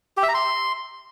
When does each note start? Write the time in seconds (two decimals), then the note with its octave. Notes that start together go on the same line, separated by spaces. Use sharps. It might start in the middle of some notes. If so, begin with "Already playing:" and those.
0.17 G4
0.23 E5
0.29 A#5
0.34 C6